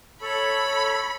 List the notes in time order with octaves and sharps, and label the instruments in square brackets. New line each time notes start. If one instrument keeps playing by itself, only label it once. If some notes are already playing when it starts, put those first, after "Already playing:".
[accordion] A4 C#5 [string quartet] B5